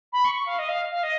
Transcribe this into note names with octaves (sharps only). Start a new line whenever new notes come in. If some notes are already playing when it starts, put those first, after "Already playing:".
B5
C#6
C#6
F5
D#5
F5
F5
D#5